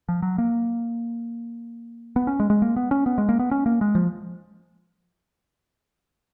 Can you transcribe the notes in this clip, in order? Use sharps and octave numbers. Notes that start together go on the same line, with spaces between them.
F3
F#3
A#3
B3
C#4
G#3
G#3
A#3
B3
C#4
B3
G#3
A#3
B3
C#4
A#3
G#3
F3